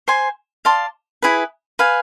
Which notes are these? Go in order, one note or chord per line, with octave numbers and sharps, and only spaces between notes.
C5 G#5 C6
D5 F5 A5 C6
E4 G#4 B4
B4 F5 G#5